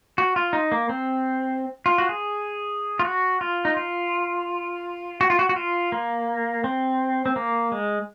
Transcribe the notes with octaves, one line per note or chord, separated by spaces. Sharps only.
F#4
F4
D#4
A#3
C4
F4
F#4
G#4
F4
F#4
F4
D#4
F4
F#4
F4
F#4
F#4
F4
A#3
C4
C4
A#3
G#3